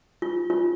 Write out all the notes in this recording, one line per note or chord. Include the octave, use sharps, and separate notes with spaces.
F4
F4